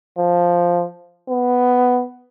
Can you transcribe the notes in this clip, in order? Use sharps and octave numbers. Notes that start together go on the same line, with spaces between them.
F3
B3